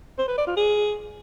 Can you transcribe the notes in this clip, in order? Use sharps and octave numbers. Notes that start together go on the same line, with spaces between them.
C5
B4
D5
F4
G#4